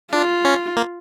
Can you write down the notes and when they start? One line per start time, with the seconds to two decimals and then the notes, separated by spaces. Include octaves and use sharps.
0.13 D4 F4
0.45 C#4
0.77 A#3